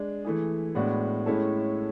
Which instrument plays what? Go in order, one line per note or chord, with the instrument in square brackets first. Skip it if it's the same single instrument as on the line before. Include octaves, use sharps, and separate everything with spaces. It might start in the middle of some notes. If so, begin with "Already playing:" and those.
Already playing: [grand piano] G#3 D4
E3 A3 E4 G#4
A2 G#3 B3 D4 F#4
A2 G#3 C#4 E4 A4